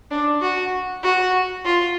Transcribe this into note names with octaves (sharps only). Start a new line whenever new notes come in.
D4
F#4
F#4
F4